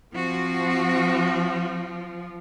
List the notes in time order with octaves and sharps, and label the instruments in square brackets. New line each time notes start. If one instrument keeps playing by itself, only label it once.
[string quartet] F3 [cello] C4 F#4